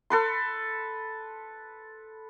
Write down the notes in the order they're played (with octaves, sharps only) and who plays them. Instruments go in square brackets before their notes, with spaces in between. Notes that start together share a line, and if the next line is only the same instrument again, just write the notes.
[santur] A4 B4 C6